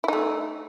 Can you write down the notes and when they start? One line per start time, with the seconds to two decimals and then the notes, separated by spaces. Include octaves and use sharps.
0.04 E4
0.08 D#4
0.13 A3